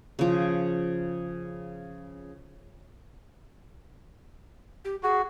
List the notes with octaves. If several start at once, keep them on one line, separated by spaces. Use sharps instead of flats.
C#3 F3
G4
F#4 G#4